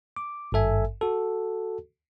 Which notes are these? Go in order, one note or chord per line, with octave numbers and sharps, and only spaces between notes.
D6
G#1 G2 A4 E5 G#5
F#4 A4